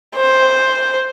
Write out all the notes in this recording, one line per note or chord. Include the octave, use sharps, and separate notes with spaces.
C5